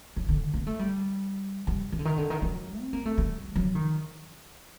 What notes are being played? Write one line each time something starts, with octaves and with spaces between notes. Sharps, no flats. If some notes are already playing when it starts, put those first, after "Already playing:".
F#3
D3
A#3
A3
G3
G3
D#3
D3
D#3
D3
D#3
F#3
C4
A#3
A3
G3
F#3
D#3